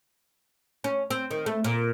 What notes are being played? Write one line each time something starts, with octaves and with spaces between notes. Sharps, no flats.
C#4
C4
D#3
A3
A#2